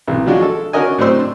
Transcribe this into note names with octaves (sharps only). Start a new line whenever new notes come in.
B1 C3 E3
F3 F#3 G#3 D4 F4 F#4
A4
C#4 D4 F#4 A#4 D#5 G#5
A2 F#3 C4 D4 C5 E6
D4